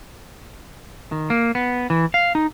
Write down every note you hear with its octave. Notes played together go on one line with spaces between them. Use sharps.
D#3
A#3
B3
E3
F5
D#4